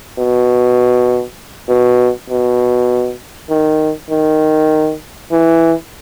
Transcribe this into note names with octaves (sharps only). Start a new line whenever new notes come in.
B2
B2
B2
D#3
D#3
E3